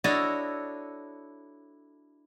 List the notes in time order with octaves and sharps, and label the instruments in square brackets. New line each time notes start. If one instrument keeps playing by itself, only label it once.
[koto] D4 E4 F#4 A4 C#5 D#5